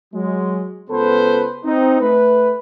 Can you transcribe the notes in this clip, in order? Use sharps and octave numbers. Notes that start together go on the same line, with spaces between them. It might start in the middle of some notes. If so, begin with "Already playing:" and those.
F#3 G#3
C#2 B3 A4 B4 C5
C4 D#4
A3 B4